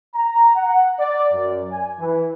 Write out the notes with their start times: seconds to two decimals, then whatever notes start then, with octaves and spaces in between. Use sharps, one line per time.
0.14 A#5
0.55 F#5
0.99 D5
1.33 F#2
1.71 G#5
1.99 E3